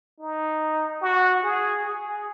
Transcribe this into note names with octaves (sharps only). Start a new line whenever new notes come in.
D#4
F#4
G#4
G#4